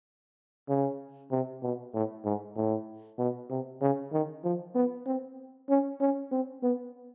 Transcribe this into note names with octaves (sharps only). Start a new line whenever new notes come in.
C#3
C3
B2
A2
G#2
A2
B2
C3
C#3
D#3
F3
B3
C4
C#4
C#4
C4
B3